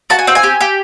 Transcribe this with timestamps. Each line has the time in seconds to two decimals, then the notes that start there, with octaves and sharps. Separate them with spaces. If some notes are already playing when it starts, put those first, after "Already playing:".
0.10 F#4 A5
0.19 G#5
0.27 C4 G5
0.35 G#5
0.43 G4
0.61 G4